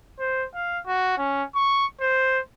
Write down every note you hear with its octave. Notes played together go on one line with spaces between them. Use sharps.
C5
F5
F#4
C#4
C#6
C5